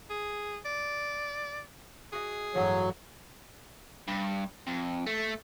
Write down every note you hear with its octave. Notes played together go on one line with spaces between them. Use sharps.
G#4
D5
F#4 G#4 D#5
A1 G2 F#3
G2
F2
A3